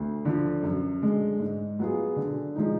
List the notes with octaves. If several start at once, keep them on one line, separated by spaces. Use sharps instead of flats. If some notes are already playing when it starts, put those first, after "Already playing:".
Already playing: D2
D3 F3
F#2
D3 G#3
G#2
F#3 B3 F4 G#4
D3
F3 G#3 D#4